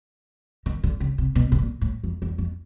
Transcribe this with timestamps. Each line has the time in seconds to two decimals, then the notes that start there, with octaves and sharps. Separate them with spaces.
0.66 D#3
0.83 D3
1.00 C#3
1.18 C3
1.35 B2
1.52 B2
1.59 A#2
1.81 A2
2.04 F2
2.22 E2
2.38 F2